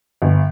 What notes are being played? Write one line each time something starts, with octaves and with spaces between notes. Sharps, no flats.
G1